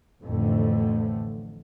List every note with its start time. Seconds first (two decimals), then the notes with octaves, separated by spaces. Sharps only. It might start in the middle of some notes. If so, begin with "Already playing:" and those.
0.22 A1 F2 A2 D3 A3